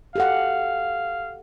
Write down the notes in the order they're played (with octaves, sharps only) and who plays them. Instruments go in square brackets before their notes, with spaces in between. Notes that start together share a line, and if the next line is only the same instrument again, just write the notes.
[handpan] G4 A4 F#5 [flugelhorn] F5